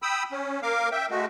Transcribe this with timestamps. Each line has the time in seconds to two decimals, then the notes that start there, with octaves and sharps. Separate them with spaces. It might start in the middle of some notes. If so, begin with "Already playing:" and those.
0.02 G5 B5 D#6 E6
0.32 C#4
0.63 A#3 A#4 F5 D6
0.92 E5 G5
1.10 G#3 A3 F#4